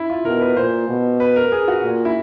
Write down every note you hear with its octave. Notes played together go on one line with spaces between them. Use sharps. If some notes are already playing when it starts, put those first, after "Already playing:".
Already playing: E4
F4
B2 A#4
B4
A#2 C5
B2
B4
A#4
G#4
F#4
A#2
E4